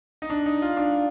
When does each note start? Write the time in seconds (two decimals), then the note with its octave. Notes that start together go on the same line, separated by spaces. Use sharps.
0.22 D#4
0.30 D4
0.46 D#4
0.62 F4
0.77 D4